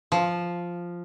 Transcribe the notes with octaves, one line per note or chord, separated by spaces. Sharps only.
F3